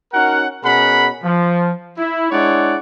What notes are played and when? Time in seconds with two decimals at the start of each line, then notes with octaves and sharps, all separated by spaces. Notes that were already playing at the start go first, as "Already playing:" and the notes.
0.13 C#4 D#4 F#4 A#4 F#5
0.63 B2 C#4 G#4 A#4 F#5 B5
1.23 F3
1.97 E4
2.30 G#3 D4 E4 C#5 D5 F#5